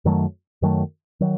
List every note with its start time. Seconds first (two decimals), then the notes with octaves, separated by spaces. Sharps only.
0.05 F#2 D#3 F#3 A3
0.62 F#2 D#3 F#3 A3
1.20 D#3 F#3